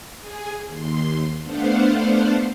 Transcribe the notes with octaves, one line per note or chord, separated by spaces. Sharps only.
G#4 G#5
D#2 C6
A3 B3 D4 C5 F5 F#5